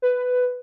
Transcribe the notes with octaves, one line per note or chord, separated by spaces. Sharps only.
B4